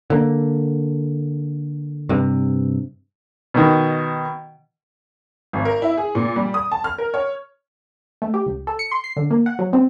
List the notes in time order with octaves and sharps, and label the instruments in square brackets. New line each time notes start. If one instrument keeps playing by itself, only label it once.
[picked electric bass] D3 A#3
G2 C3
[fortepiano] B2 D#3
[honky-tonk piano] G#1
A#4
E4
G#4
A#2
G3
D#6
A5
F6
A#4
C#5
[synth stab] A3
G4
C#2
A4
C#7
C6
C7
D3
A#3
F#5
F#3
C4